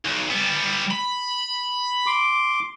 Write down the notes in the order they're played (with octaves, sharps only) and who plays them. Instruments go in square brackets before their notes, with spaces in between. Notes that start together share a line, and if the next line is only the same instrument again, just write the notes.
[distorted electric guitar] B1
G3 B3
B5
[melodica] C6 D6